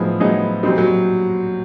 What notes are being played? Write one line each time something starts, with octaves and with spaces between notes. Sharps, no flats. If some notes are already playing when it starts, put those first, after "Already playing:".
Already playing: A2 F3 F#3 B3 D#4 G#4
A2 F#3 B3 D#4 G#4
A#2 F#3 G3 C4 D#4
F#3